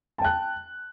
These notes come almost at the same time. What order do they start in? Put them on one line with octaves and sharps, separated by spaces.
A5 G5 F#6